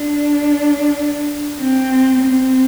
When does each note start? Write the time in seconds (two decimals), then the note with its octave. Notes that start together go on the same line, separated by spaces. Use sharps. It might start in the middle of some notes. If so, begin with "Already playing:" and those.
Already playing: D4
1.59 C4
2.21 C4